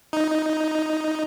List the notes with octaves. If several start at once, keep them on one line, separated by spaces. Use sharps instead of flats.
D#4